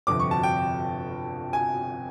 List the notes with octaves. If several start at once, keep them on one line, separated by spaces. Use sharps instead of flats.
G1 F2 C3 F3 D6
C#6
A5
G5
G#5